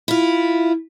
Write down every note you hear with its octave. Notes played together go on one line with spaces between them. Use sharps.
E4 F4